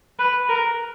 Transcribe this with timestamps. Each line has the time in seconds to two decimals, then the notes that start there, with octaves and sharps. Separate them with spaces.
0.19 B4
0.49 A#4